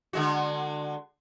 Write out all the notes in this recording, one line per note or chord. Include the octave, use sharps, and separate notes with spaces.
D3 G#3 F#4